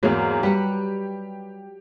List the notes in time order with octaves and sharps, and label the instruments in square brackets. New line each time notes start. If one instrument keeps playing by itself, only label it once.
[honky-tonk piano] E2 G#2 [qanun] F#3 A#3 F5
[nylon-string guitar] G3 [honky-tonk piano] G4 [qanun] B4 F#5